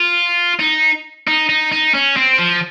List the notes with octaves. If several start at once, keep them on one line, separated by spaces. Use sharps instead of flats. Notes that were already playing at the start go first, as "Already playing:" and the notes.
Already playing: F4
D#4
D#4
D#4
D#4
C#4
C4
F3